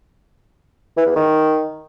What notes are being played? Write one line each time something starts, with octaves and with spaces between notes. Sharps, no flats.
E3
E2
D#3